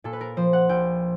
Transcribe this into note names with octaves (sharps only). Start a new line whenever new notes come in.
A#2 A4
B4
A#4
F3 C5
F#5
A#1 G5